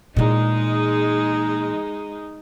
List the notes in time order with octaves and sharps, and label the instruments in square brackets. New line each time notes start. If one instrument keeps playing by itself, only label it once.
[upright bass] A#2 E3 [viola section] G#3 D#4